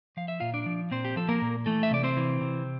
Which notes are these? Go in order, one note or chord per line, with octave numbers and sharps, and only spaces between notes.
F3 F5
E5
A#2 F4 F5
D4 D5
F3
A#2 C4 C5
G4
F3 A4
A#3 A#4
A#2
E3 A3 A4
E5
C3 D5
C4 C5
E3
C3